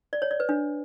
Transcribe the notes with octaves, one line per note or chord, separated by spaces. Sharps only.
D5
C#5
D5
B4
D4